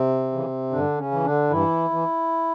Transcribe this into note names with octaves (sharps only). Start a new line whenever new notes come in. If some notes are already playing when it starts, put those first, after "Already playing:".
Already playing: C3 C4
C#3 E3
G2 D3 D4
C#3 C#4
E3
D3 D4
G2 E3 E4
E3